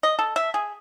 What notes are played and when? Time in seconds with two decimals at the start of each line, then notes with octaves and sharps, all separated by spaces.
0.03 D#5
0.19 A4
0.36 E5
0.54 G#4